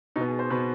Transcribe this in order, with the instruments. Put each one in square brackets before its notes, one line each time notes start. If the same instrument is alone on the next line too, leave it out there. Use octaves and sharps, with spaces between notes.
[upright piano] B2 D#4
B3
G#4
C5
B2 B3 B4